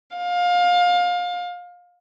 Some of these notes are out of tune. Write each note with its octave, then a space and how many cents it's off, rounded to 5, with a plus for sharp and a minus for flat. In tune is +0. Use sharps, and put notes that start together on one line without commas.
F5 +25